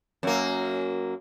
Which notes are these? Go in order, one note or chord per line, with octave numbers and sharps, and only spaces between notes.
F#2 A#3